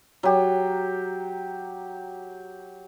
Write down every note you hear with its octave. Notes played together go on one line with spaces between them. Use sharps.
F#3 G4